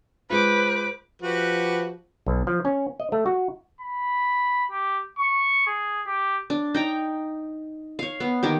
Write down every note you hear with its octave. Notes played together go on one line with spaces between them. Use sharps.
G#3 F4 B4 C5 D6
F3 F#4 G4 B4
B1
F3
C#4
D#5
A3
F#4
B5
G4
C#6
G#4
G4
D4
D#4 G5 A#5
C#5 F5
B3
D#3 A#3 G4